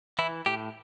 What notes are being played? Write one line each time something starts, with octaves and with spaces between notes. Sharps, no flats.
E3 E4
A2 G4